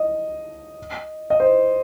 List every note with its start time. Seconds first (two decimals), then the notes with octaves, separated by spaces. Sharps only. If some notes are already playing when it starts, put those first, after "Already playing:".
Already playing: D#5
1.30 D#5
1.40 C5